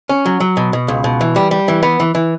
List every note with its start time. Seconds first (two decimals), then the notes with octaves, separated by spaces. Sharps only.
0.09 C#4
0.26 F#3
0.40 F#3
0.57 B2
0.73 B2
0.88 C#2
1.04 B2
1.21 E3
1.36 G3
1.51 G3
1.68 E3
1.83 B3
2.00 E3
2.15 E3